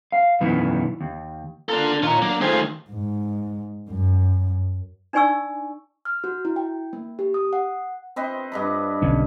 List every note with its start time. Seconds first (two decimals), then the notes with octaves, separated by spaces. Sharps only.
0.12 F5
0.40 F#2 B2 D#3 E3 B3
1.01 D#2
1.69 A#3 D4 F4 A4
2.03 A#2 D#3 F4 C#5 A#5
2.22 F#3 A#3 D4
2.41 D#3 A3 F4 G#4 C5
2.90 G#2
3.89 F#2
5.13 D4 D#4 D5 G#5 C#6 E6
6.05 F6
6.24 F#4
6.45 E4
6.56 G5
6.93 A#3
7.19 G4
7.34 D#6
7.53 F#5
8.16 C4 B4 D#5
8.52 G2 D#5 B5
9.02 B1 D3 C#4